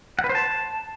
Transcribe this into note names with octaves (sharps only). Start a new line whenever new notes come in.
F#5
B4
C5
A5